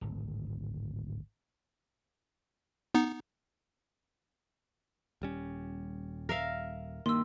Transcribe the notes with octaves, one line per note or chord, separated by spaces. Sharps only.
D1 G#1
B3 D#4
D#1 G3 C#4
A#4 E5 F5
G2 D#3 A#3 C6 E6